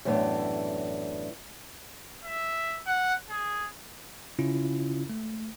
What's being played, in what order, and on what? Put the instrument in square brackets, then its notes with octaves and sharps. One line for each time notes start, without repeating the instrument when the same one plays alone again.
[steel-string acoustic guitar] F#2 A2 E3 B3 D4 E4
[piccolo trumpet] E5
F#5
G#4
[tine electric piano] C#3 C#4 E4 F4
A3